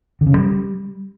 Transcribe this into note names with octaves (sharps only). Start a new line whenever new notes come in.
D3
C#3
G2
G3